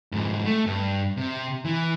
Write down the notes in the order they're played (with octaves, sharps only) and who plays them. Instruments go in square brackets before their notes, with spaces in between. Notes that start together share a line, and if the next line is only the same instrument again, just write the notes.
[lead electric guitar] F2 G#2
A3
G2
C3
E3